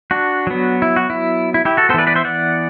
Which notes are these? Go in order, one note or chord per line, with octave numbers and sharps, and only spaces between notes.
D4 F#4
F#3 B3
E4
F#4
E4
E4
E4 G4
F#4 A4
B3 A4 C5
E3 B4 D5
B4 D5
C5 E5
D5 F#5